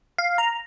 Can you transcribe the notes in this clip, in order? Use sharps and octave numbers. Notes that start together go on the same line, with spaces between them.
F5
A#5